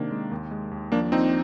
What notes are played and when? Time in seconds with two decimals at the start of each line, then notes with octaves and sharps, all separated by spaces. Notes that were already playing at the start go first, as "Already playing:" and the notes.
Already playing: C3 D#3 A#3 D4
0.11 G#3
0.31 D#2
0.51 G#3
0.71 D#2
0.92 F3 A#3 D4
1.12 F3 C4 D#4